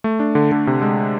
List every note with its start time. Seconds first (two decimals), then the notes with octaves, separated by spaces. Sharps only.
0.04 A3
0.20 D4
0.35 D3
0.52 D3
0.67 C3
0.82 G#3